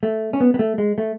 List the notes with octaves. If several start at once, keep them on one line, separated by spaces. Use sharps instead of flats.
A3
C#4
B3
B3
A3
G#3
A3